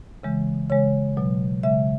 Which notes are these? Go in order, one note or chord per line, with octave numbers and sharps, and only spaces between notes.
C#3 E3 G#3
C#3 G#3 C#5
B2 F#3
C#3 G#3 E5